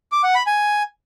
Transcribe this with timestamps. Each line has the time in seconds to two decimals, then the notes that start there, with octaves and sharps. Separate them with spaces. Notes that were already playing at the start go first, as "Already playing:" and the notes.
0.12 D6
0.23 F#5
0.35 B5
0.47 G#5